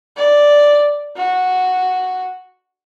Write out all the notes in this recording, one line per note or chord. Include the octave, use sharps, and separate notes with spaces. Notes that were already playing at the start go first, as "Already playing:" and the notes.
D5
F#4